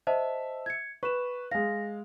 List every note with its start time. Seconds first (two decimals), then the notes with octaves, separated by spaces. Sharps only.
0.07 C5 D#5 E5 A5
0.66 G#6 C#7
1.03 B4 C#6 E7
1.51 G#3 F5 A#6